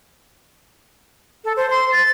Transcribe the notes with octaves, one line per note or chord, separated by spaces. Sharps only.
A4
C5
C6
A6